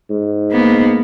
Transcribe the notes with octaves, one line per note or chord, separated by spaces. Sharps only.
G#2
A#3 B3